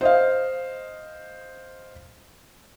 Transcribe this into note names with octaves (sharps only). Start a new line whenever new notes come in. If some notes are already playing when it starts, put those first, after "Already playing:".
C5 D#5 F5